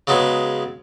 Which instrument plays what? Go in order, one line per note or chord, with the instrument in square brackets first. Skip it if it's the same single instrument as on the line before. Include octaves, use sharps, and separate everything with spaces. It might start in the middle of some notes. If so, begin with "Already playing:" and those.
[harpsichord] C#3 F#3 G#3 B3